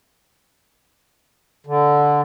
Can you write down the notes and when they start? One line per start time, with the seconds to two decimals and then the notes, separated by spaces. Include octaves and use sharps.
1.67 D3